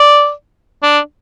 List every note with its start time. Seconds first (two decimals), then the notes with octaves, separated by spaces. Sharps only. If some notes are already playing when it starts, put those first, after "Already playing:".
Already playing: D5
0.83 D4